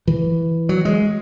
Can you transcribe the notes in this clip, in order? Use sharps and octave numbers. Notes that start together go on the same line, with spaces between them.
E3
F#3
G#3